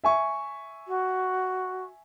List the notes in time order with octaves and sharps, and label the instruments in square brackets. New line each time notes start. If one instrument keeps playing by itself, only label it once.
[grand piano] E5 G#5 C#6
[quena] F#4